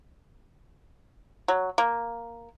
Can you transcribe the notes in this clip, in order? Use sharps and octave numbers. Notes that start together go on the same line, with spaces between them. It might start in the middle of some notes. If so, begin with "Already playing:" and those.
F#3
A#3